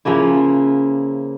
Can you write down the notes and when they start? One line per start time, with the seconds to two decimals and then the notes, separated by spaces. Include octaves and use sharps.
0.05 C#3 F3 A#3 E4